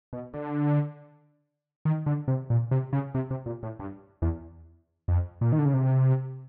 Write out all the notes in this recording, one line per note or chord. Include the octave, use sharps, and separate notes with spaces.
B2
D3
D#3
D3
C3
A#2
C3
C#3
C3
C3
A#2
A2
G2
E2
F2
A#2
D#3
D3
C#3
C3